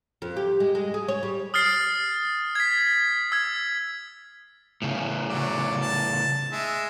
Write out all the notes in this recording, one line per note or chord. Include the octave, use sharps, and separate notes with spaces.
F2
G4
G#3
G#3
G#4
C#5
G3
D#6 F6 A6 C7
G#6 B6
E6 G#6
A2 C#3
F#3 D5
A5
G#3 E5